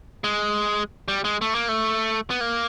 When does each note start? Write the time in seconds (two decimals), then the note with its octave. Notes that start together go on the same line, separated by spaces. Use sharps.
0.24 G#3
1.08 G3
1.24 G#3
1.41 A3
1.55 A#3
1.69 A3
2.30 B3
2.41 A#3